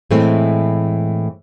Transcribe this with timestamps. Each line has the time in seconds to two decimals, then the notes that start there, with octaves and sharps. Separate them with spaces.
0.11 A2 E3 G#3 A3 C4